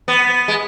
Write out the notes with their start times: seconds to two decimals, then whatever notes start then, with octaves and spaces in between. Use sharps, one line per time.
0.08 B3
0.48 G#3